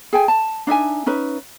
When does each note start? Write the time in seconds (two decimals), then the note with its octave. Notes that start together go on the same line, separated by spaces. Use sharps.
0.13 G#4 G5 G#5
0.28 A5
0.67 D4 D#4 E5 G#5
1.06 C#4 D#4 B4 E5